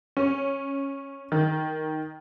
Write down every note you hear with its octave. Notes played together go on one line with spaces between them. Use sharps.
C#4
D#3